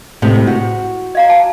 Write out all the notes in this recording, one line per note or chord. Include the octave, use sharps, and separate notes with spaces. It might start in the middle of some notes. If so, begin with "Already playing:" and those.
A2 C3 G#3
F#4
D#5 F5 A#5
A5